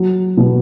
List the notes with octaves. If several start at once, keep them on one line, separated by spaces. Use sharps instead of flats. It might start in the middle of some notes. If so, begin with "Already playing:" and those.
Already playing: F#3
B2